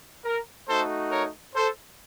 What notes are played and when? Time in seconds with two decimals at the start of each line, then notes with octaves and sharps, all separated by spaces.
0.24 A#4
0.68 A3 D#4 F#4 A4 C5
1.11 A#4 C#5
1.55 A4 C5